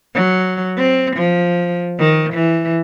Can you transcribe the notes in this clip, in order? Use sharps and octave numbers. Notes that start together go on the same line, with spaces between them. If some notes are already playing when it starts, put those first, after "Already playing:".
F#3
C4
F3
D#3
E3